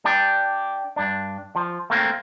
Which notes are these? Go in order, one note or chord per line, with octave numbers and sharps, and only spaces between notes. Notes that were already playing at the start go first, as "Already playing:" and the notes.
D4 G4
G2 D4
F3
A3 A#3 C4